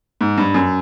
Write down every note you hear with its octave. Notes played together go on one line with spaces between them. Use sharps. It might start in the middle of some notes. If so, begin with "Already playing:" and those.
G#2
G2
F#2